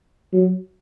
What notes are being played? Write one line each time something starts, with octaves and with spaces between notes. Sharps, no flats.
F#3